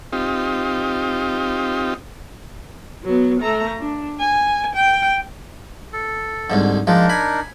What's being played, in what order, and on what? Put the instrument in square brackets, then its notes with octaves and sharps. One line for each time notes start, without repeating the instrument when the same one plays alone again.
[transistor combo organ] C4 D#4 F4 G4
[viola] F#3 B3
A3 A#5
D4
G#5
G5
[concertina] A4
[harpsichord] C2 G#2 D3
[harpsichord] F3 G#3 [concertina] D4 D#4 A#4
[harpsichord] G#5 B5